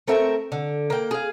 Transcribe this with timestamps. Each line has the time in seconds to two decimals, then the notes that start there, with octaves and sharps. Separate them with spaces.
0.08 A3 C4 A#4 E5
0.52 D3
0.90 A#3 G5
1.11 G#4 F5